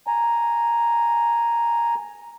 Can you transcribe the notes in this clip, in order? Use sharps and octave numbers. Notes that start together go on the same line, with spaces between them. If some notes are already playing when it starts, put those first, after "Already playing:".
G#5 A#5